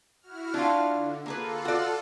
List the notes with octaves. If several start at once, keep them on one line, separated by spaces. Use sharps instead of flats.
E4 F#4 F6
D4 F4
D3
A#3 F4 G#4 A4 B4
F#4 D5